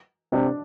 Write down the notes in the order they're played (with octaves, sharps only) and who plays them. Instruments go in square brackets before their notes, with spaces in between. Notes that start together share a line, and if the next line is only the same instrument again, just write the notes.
[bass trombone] C3 [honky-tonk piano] D4